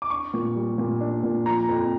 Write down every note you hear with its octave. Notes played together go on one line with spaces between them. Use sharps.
D6
D4 C#6
A#2
G3
A#2
D4
A#2
F3 A#5
F2